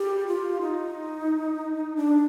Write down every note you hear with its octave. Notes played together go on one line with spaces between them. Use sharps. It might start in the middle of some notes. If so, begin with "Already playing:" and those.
Already playing: G4
F4
D#4
D4